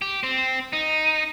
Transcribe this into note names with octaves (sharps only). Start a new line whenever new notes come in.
G4
C4
D#4